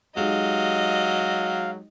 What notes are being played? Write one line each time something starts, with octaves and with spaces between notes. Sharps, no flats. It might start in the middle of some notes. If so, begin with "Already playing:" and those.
F#3 G#3 D#4 G4 D#5 F5